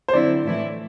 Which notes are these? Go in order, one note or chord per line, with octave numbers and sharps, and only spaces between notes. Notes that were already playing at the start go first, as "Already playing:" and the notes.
C5
D3 F#3 C4 E4 D5
A2 E3 A3 E4